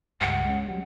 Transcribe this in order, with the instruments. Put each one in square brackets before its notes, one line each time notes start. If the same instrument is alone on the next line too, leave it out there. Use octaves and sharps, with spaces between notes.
[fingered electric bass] C#2 G2 [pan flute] F#5
[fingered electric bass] G#3 C#4
F#3 G3